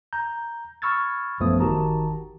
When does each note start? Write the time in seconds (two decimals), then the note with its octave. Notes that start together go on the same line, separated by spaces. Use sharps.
0.13 A#5 G6
0.82 B5 C#6 E6 F6 G#6 A6
1.40 A1 F#2 F3 A3 B3 D#6
1.60 G1 D#3 F#4 G4 A5 A#5